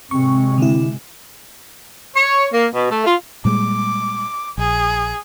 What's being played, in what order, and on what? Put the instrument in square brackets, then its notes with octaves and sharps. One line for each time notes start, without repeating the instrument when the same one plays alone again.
[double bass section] G#1 C3 G#3 [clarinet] C4 [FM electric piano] C#6
[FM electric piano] D3 E4
[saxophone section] C#5
A#3
B2
A3
F4
[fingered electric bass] A#2 G3 G#3 [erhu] D6
[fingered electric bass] A#1 [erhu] G#4